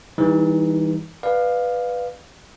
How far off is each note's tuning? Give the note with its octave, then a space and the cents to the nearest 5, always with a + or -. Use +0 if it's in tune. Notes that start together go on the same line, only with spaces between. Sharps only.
E3 -20 G3 +25 D#4 +0
B4 +0 D5 +40 F5 +5